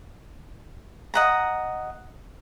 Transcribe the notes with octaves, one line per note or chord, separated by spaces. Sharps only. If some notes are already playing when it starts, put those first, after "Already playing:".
D#5 F#5 A#5